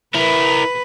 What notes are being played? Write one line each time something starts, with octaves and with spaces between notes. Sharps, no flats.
E4 A#4 B4